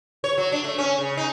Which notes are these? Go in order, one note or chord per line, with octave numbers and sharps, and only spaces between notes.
C#5
F#3
D4
A3
C#4
C#3
D#4